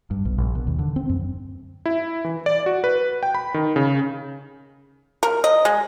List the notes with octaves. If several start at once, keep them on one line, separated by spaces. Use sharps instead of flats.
G2
B1
A#1
B2
D#2
D3
C4
F#2
E4
E3
D5
F#4
B4
G5
B5
D#3
C#3
A#4
D#5
G#3